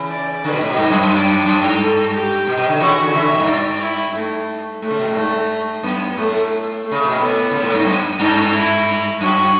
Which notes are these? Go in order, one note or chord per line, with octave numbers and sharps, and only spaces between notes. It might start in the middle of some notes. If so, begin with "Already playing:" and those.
Already playing: C#3 E3
D5
D3 B4
B2
A2
B2
G2
F#2
F#2
D5
F#2
G2
A4
G4
B2
B2
D3
C#3 E3 F#4
D3
C#3 E3 E5
D3
B2
G2
D5
E4
G2 A3
A2 A3
C#3
B2
A2
G2 A3
F#2 B3
A2 A3
A3
C#3
B2
A2 B3
C#3
A2
G2
F#2
G2 D4
E4
F#2 F#4